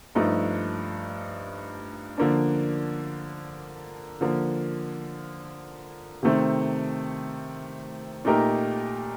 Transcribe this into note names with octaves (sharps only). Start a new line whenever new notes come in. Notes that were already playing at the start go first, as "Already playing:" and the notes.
G2 F3 A3 D#4
D3 F3 A#3 D4
D3 F3 A#3
C3 D#3 A3 C4
A#2 A3 D#4 G4 A#4